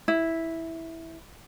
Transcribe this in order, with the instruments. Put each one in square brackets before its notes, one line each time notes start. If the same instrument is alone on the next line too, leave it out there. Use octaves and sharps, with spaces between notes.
[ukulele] E4